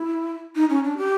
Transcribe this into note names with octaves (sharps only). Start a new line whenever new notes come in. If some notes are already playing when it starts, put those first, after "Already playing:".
Already playing: E4
D#4
C#4
D4
G4